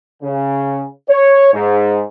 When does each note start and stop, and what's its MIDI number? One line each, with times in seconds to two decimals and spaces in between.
0.23 0.86 49
1.09 1.53 73
1.54 2.04 44